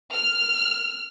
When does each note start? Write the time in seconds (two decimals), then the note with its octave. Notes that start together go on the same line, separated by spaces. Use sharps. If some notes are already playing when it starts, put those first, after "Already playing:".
0.12 F6